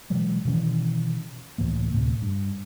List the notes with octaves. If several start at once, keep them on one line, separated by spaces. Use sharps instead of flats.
B2 E3 F#3 G#3
B2 D#3 E3 C#4
C#2 A2 E3 A#3
D2 A2 C3
G2